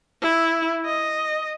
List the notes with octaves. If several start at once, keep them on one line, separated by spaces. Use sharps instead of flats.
E4
D#5